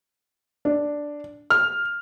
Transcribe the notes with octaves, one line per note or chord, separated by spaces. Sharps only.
D4
F6